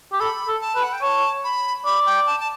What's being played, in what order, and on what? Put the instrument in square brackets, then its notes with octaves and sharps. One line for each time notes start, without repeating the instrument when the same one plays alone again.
[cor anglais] G4
[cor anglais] A4 [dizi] B5
[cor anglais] A4
[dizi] A5
[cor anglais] B4
[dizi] F#5
G5
[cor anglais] C#5 [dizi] A5
[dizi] B5
[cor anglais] D5 [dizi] B5
[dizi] G5
A5
A5